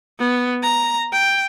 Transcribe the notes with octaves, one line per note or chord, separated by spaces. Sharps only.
B3
A#5
G5